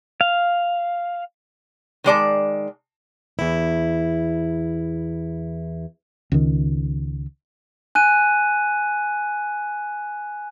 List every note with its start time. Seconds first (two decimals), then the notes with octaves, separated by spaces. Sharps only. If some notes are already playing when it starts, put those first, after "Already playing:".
0.21 F5
2.04 D#3 G#3 D5 A5
3.39 E2 E4
6.32 C#2 D#3
7.95 G#5 F#6 D#7